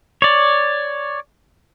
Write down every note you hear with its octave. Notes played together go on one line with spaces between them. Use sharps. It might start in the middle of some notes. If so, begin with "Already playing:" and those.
C#5 D5